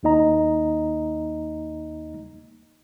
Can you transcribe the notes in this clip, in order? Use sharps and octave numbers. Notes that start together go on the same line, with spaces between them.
D#2 A#3 D#4 D#5 A#5